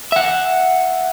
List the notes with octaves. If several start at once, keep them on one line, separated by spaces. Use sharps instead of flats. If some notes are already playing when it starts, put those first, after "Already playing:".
E5 F#5